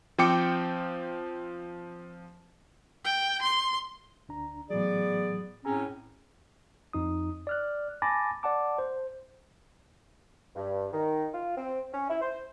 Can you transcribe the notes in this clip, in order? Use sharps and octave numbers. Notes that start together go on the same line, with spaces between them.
F3 C4 G5 D6 C#7
G5
C6
D2 D4 A#5
A2 E3 F#3 B3 G#4 D5
A2 C4 C#4 G#4 G#5 A#5
F2 D#4 D#6
D5 F6 F#6
G#5 A5 B5 D6 A6 A#6
D5 F#5 A5 D6
C5
G2
D#3
F4
C4
C#4
E4
C5